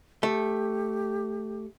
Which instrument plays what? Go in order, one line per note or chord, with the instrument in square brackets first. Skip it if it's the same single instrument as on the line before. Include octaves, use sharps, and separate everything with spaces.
[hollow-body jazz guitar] A3 [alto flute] G4